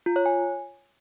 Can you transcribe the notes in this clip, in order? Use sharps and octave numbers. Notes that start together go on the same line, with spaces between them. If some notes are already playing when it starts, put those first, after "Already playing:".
F4
C#5
G#5